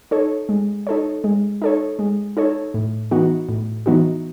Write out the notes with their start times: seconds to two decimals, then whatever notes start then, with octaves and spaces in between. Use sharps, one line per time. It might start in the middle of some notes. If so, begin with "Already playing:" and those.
0.11 D#4 A4 C#5
0.49 G#3
0.87 D#4 A4 C#5
1.24 G#3
1.62 D#4 A4 C#5
1.99 G#3
2.37 D#4 A4 C#5
2.74 A2
3.11 E3 B3 D#4 F#4
3.49 A2
3.86 E3 B3 D#4 F#4